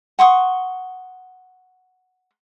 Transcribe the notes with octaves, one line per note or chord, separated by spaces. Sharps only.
F#5 C6 C#6 D#6